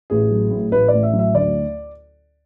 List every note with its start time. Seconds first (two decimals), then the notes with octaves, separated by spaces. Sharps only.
0.10 A1 G#4
0.31 F#3
0.51 A2
0.72 A1 B4
0.88 D5
0.94 A1
1.03 E5
1.13 F#3
1.19 E5
1.34 D2 D5